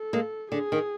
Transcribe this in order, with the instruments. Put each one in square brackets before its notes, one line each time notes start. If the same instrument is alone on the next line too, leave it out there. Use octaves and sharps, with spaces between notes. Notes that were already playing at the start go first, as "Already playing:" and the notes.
Already playing: [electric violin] A4
[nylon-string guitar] G#3 A#3
[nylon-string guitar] D3 [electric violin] G#4
[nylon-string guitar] D#3